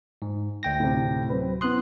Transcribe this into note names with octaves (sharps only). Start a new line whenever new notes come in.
G#2
D2 G5 A#6
A2 C3
F#3 C4 B4
B3 E4 C6 D#6 F#6